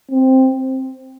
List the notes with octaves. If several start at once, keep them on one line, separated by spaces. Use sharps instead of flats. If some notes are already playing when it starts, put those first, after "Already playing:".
C4